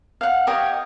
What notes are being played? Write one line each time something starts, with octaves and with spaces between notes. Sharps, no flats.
F5 F#5
G4 C#5 D#5